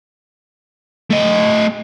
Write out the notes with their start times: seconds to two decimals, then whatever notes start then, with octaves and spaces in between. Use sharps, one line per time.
1.11 A3 D#5